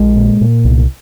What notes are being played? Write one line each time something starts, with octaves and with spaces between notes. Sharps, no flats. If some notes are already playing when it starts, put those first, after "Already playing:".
Already playing: A#1 G#3
A#2
A#2
C2